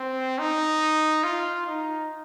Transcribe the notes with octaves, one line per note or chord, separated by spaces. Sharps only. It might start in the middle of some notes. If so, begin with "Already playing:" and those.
Already playing: C4
D#4
F4
D#4